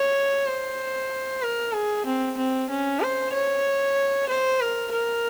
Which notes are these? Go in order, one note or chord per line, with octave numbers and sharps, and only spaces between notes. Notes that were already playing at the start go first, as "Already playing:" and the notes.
Already playing: C#5
C5
A#4
G#4
C4
C4
C#4
C5
C#5
C5
A#4
A#4